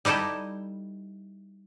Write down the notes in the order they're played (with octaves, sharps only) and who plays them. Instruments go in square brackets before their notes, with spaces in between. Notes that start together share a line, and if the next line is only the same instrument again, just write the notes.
[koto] G3 D#4 E4 G4 A4